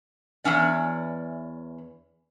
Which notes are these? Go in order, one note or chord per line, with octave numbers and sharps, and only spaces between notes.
E2 G#2 E3 C#4 D5